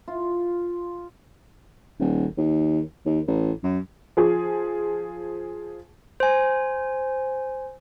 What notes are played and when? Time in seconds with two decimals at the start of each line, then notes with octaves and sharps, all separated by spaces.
0.08 F4
2.00 D#1
2.37 D#2
3.06 D#2
3.27 A1
3.64 F#2
4.17 F3 G#4
6.20 C5 G#5